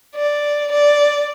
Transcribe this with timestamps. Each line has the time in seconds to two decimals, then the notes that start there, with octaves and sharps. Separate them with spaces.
0.16 D5
0.72 D5